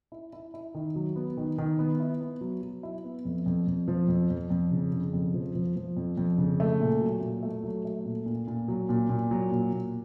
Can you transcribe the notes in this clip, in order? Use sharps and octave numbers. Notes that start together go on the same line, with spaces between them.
E4
E4
E4
D#3
F#3
B3
D#3
D#3
B3
E4
B3
F#3
F#3
E4
B3
F2
F2
F2
F3
F2
F2
F2
C#3
C#3
F2
F3
F3
F3
F2
F2
C#3
A3
A#2
F#3
A#2
A3
F#3
A3
A#2
A#2
A#2
F#3
A#2
A#2
F#3
A#2
A#2